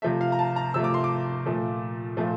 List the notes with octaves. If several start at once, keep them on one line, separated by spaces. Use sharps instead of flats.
C3 F3 A3 E5
F5
A#5
A5
A#5
C3 F3 A3 E6
D6
C6
D6
A#2 F3 A3
A#2 F3 A3